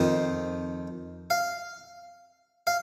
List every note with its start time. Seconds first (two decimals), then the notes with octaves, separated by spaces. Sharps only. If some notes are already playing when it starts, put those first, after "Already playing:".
Already playing: F2 D#3 C5
1.30 F5
2.67 F5